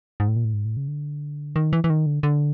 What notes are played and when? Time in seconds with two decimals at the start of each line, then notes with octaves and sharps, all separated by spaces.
0.20 G#2
0.28 A2
0.36 A#2
0.45 A2
0.54 G#2
0.65 A2
0.77 C#3
0.88 D3
1.56 D#3
1.73 E3
1.84 E3
1.90 D#3
2.06 D3
2.23 D3